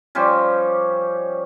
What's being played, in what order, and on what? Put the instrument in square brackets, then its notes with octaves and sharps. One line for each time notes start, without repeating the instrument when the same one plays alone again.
[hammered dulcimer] F3 G3 C#4 G4